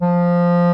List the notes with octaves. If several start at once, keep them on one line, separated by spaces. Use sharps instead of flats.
F3